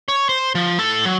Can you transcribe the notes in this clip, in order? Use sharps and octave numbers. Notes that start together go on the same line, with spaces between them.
C#5
C5
F3
A2 A4
F#3